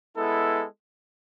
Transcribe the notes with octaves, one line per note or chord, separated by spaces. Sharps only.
G#3 B3 E4 A4